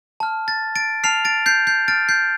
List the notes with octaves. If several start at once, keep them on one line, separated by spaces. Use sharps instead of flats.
A5 F6
A6
A6 D7
A5 F6 C7 F7
A6 D7
G6 C7
G6 C7
A5 F6 A6 D7
G6 C7